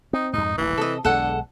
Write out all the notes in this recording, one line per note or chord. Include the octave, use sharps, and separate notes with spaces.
C4 D#4
F2 G#2 D#4
D#1 A1 A#2 E3
C3 A4 D#5
B1 E2 D3 G#3 A4 F#5